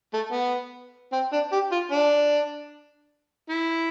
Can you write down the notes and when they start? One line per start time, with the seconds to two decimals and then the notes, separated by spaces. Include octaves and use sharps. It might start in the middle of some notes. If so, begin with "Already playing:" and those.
0.14 A3
0.32 B3
1.13 C4
1.33 D4
1.52 G4
1.72 F4
1.91 D4
3.50 E4